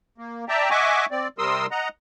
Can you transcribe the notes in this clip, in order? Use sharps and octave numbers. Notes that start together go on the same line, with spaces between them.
A#3
D5 E5 G5 A5 A#5
D#5 E5 F#5 G#5 C#6 D6
C4 D5
C3 G3 A#4 C6 D#6 E6
D#5 F#5 A#5